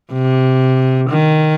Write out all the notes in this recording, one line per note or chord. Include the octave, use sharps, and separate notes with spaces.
C3
D#3